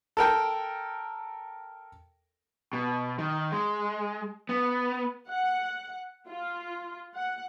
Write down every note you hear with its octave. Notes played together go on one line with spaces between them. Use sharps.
A4 A#4 G5
B2
D#3
G#3
B3
F#5
F4
F#5